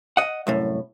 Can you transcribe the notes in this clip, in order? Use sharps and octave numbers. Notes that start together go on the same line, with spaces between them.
D#5 F#5
C2 F#2 A2